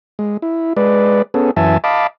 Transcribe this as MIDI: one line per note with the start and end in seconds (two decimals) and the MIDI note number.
0.19 0.37 56
0.42 0.73 64
0.77 1.22 56
0.77 1.22 71
0.77 1.22 74
1.34 1.51 59
1.34 1.51 61
1.34 1.51 68
1.34 1.51 69
1.57 1.78 42
1.57 1.78 52
1.57 1.78 76
1.57 1.78 80
1.57 1.78 81
1.84 2.07 75
1.84 2.07 77
1.84 2.07 81
1.84 2.07 83
1.84 2.07 86